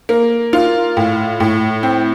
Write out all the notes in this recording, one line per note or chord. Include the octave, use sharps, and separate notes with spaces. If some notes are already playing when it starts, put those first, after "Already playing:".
A#3
F4
A2
A2
C4